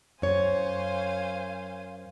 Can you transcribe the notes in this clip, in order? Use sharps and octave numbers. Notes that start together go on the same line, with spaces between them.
F#2 C5 C#5 F5 G#5